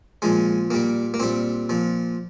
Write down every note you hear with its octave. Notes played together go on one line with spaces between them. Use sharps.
A#2 F3 G#3
A#2 G3 A#3
A#3
A#2 G3 C4
A#2 F3